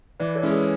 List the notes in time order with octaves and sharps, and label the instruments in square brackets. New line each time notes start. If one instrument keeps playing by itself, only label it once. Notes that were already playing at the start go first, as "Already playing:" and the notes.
[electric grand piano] E3 [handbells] B4 D5
[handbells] A4 C#5
[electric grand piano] G#3 C#4 E4
[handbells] G#4 B4